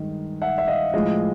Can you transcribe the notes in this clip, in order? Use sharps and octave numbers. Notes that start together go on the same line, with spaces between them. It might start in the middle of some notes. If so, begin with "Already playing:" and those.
Already playing: G2 D#3 G#3
E5 F#5
E5
D#5 F5
A2 F3 G#3 D#5 F5